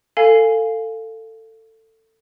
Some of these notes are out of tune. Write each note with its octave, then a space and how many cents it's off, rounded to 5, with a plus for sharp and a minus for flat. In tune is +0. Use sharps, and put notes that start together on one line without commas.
A4 +20 F5 +0 G#5 +0